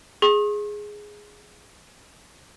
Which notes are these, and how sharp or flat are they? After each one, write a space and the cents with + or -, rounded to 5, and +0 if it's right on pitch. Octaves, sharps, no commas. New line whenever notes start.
G#4 +0 C#6 -45